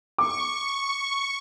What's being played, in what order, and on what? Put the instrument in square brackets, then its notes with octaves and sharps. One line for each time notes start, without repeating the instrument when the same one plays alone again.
[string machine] C#6 [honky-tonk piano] D6